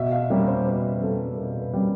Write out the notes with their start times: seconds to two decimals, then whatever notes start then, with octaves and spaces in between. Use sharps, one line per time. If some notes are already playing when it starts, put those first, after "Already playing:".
Already playing: B2 E5
0.12 F5
0.30 G3 A#3 C#4
0.47 C5
0.66 B2 B4
1.01 G3 A#3 C#4 A4
1.38 B2 A#4
1.62 B4
1.73 G3 A#3 C#4